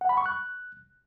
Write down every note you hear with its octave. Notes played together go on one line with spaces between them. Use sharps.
F#5
B5
C#6
F#6